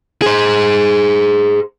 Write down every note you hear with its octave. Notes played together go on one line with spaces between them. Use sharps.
G#4 C5